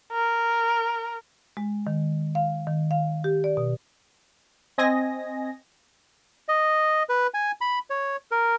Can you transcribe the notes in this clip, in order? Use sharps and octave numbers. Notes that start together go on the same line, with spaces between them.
A#4
G#3
D#3
F5
D#3
F5
G4
D5
B2
C4 D#5 G#5 A#6
D#5
B4
G#5
B5
C#5
A#4